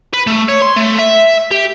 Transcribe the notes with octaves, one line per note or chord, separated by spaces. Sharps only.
B4
A3
C#5
C6
A3
E5
G4